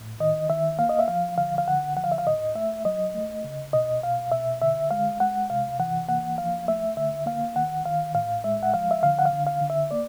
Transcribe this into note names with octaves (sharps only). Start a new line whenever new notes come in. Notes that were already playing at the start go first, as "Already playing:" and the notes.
Already playing: A2
D#3 D#5
D#3 E5
A#3 F5
D#5
E5
F3 F5
D3 F5
F5
D3 F#5
F3 F#5
F5
E5
F5
A2 D#5
A3 E5
F#3 D#5
A3
C#3
B2 D#5
B2 F5
B2 E5
D3 E5
G#3 F5
G#3 F#5
C3 F5
E3 F#5
A#3 F#5
F3 F5
A3 E5
D3 E5
A#3 F5
D#3 F#5
D#3 F5
A2 F5
G#3 E5
F#5
F3 F5
E5
D3 F5
F#5
F5
D3
F5
D3
E5
A#3 D5